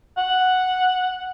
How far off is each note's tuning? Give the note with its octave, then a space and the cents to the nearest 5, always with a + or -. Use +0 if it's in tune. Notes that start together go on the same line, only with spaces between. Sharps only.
F#5 -5